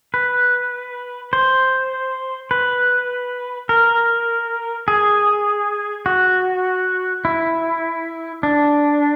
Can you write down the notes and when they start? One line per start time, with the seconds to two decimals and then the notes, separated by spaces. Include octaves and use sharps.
0.14 B4
1.33 C5
2.51 B4
3.69 A#4
4.88 G#4
6.06 F#4
7.25 E4
8.43 D4